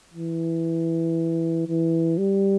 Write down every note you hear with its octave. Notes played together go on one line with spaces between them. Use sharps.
E3
E3
G3